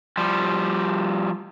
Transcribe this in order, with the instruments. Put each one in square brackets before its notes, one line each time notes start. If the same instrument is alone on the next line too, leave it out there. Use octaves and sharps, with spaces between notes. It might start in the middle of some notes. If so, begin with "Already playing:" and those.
[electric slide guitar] F3 G3